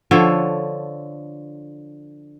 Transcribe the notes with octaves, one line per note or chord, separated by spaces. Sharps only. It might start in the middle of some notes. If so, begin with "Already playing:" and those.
D3 F3 A4 C#5